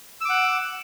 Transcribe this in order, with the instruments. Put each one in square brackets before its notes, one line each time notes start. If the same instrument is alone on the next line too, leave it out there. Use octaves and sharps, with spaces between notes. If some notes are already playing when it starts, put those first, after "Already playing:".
[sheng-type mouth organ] E6
D6
F#5